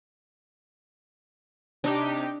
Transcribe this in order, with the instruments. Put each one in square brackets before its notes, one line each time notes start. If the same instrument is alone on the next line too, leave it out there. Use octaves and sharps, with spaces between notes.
[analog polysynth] C3 D#4 G4 [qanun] D4